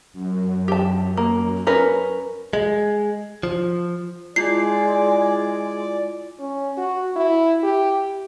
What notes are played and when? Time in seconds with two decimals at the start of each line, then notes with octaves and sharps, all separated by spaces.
0.13 F#2
0.68 G4 A5
1.17 A#3
1.67 C#4 A#4 B4
2.53 G#3
3.43 F3
4.36 G#3 E4 F4 D5 C7
6.39 C#4
6.77 F#4
7.16 E4
7.63 G4